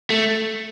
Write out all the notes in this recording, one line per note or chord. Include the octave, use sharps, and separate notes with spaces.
A3